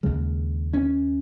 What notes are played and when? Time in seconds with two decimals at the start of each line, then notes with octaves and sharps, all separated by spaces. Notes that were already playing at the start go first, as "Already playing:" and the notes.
0.03 D#2 C#3 G#3
0.73 C#4